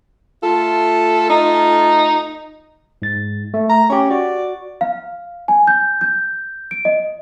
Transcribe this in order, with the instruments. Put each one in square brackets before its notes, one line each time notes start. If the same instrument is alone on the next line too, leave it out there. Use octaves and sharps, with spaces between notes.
[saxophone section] A3 F4 [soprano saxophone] A4
[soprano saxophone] D#4
[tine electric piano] G#2 A6
A3
[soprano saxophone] A#5
[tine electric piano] C#4 G4 [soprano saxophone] C#5
[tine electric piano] F#4 [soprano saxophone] D5
[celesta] F5
G#5
G6
G6
D7
D#5